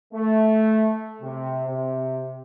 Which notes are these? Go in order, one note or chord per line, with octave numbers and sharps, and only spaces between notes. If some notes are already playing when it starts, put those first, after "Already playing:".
A3
C3
C3